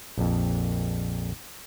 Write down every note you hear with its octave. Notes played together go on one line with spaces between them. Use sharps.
A#1 F2